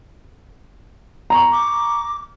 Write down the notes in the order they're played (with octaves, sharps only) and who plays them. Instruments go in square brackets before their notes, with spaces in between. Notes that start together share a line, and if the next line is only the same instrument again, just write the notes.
[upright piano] A#5 C#6
[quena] D6